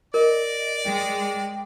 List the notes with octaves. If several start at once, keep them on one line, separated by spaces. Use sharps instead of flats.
A#4 D5 D#5
G#3 G5